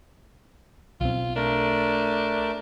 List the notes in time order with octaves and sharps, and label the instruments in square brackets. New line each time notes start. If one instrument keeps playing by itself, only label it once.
[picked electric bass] B1 C4 [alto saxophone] F4
[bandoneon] A3 A#4 [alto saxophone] D4